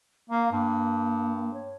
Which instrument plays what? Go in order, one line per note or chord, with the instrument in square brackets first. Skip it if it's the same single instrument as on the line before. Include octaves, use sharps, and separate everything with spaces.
[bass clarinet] A#3 [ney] F5
[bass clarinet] G2 [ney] A#3
[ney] C#5